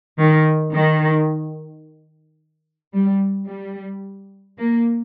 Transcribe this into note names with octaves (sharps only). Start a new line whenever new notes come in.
D#3
D#3
G3
G3
A#3